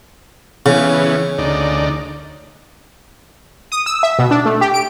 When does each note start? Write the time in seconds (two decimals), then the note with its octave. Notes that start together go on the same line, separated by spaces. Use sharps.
0.66 C#3 E3 B3 C#4
1.38 D2 D#4 D5
3.72 D#6
3.86 E6
4.03 E5
4.19 B2
4.31 D4
4.46 A3
4.61 G4
4.74 D7